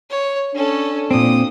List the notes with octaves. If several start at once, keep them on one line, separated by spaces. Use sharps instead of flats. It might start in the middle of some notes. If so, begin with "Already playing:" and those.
C#5
C#4 D4 A4
A#2 C4 D#6